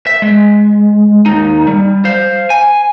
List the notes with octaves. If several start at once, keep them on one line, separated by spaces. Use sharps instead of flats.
E5
G#3
D#2 D#4
G3
C5 F5
G#5